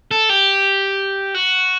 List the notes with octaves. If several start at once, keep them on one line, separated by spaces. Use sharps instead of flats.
A4
G4
F#4